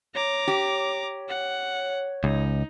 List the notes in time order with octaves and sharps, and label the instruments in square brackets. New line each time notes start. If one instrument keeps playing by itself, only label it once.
[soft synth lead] C#5 [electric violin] A#5 D6
[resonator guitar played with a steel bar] G4
[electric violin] F#5
[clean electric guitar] C#2 [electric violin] D#4